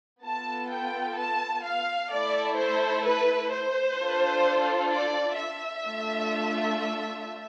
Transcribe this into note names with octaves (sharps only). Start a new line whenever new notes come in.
B3 F4 A4 A5
G5
A5
F5
A3 E4 A4 D5
C5
B4
C5
D4 F4 A4
D5
E5
A3 D4 F4 A4